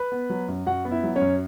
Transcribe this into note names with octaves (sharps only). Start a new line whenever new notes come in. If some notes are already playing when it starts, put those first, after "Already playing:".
Already playing: B4 B5
B3
F#3
F#2
F#2 F#4 F#5
B3
E4 E5
F#3
C#4 C#5
F#2